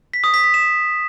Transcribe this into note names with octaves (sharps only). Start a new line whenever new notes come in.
B6
D#6
B6
B6
E7